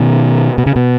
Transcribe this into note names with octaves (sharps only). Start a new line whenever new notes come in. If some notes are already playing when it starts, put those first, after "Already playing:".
Already playing: B2 D#3
B2
C#3
B2